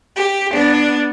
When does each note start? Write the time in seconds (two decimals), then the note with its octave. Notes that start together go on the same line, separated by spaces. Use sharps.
0.17 G4
0.51 B3 D4